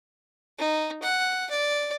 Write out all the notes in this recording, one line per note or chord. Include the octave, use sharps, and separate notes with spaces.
D#4
F#5
D5